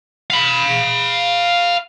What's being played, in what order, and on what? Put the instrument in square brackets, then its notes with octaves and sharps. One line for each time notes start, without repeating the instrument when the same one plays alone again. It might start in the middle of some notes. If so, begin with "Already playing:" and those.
[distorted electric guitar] F5 B5